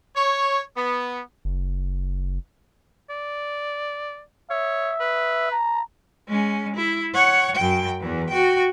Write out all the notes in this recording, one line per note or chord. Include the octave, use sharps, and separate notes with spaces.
C#5
B3
F#1
D5
C#5 E5
B4
A#5
G#3 C#4
E4
C#5 F#5
F#2 G5
E2 E3
F#4 G5